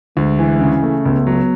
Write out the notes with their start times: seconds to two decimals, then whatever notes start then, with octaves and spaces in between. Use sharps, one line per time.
0.17 D2 G#3
0.39 E3
0.61 C#3
0.83 A3
1.05 C#2 B3
1.27 F#3